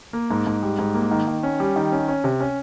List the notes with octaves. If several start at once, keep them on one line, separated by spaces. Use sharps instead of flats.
A#3
G#2
G#2
G3
G#2
A#3
D#3
D#3
C#4
G3
D#3
C#4
C#4
C3
C#4